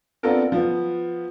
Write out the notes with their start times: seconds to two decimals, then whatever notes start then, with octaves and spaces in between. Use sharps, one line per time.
0.23 B3 C4 D4 F4 A4 A#4
0.52 F3 B3